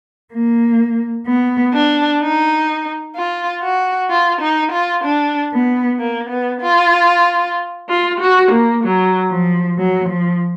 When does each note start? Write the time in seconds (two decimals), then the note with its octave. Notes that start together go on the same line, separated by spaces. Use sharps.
0.32 A#3
1.27 B3
1.74 D4
2.22 D#4
3.17 F4
3.64 F#4
4.11 F4
4.41 D#4
4.73 F4
5.05 D4
5.53 B3
5.99 A#3
6.30 B3
6.62 F4
7.88 F4
8.19 F#4
8.52 A#3
8.83 F#3
9.29 F3
9.78 F#3
10.09 F3